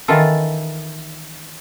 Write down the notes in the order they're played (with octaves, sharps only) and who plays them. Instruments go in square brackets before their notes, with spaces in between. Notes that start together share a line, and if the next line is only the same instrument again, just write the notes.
[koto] D#3 E3 F4 A4